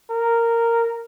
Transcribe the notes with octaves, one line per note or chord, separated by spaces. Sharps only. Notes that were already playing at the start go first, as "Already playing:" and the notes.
A#4